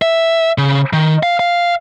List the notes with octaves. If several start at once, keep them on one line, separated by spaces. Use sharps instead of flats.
E5
C#3
D#3
F5
F5